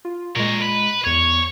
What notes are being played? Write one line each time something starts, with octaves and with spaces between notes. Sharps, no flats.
F4
A#2 G#3 A#4 C#5
B4
E2 C#5 G#6